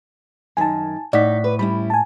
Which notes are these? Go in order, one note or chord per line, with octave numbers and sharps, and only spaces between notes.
F#2 D#3 G#5 A5
A2 D#4 D5 F#5 B6
B4
G3 C#4 E4 B5
G#5 A5